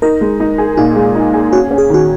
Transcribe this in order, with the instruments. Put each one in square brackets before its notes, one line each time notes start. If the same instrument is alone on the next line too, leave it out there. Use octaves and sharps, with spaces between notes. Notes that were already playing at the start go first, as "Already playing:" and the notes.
[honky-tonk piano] D#4 [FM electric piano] A#4
[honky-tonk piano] G#3
D#4
G#4
[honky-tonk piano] A#2 [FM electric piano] D#4
[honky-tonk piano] G#3
D#4
G#4
[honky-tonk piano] C#4 [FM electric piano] F#4
[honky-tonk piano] C#4
[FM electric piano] G#4
[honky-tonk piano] D#3 [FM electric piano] F#4